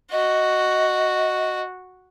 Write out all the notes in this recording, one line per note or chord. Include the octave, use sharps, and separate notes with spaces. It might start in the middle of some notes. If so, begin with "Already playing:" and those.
F#4 D#5